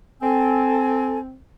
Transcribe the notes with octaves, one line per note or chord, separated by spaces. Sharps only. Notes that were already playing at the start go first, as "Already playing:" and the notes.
C4 A4 G#5